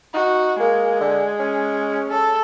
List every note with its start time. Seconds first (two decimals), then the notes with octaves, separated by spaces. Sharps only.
0.14 D#4 F#4
0.59 G#3 A#3
1.01 D3
1.39 C#4
2.09 A4